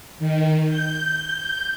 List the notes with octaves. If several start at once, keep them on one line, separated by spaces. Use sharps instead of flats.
D#3
G6